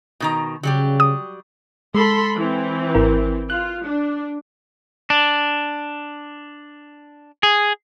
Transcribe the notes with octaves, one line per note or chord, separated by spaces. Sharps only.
B2 D#3 A#5
C#3 F#3 G3 G4
D#6
G#3 A4 B5 C6
E3 C4
G#1 E4 A#4
F4 F#6
D4
D4
G#4